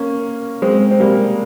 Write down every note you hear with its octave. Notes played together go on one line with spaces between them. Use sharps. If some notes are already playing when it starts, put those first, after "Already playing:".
Already playing: A#3 C#4
G#3 C4
C4
G3 A#3